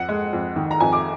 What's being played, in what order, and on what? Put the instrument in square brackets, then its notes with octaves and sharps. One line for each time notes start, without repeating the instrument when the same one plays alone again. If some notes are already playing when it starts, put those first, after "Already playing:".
Already playing: [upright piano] F2 F#5
G#3
F2
D#3
A#5
F2 G#5
D6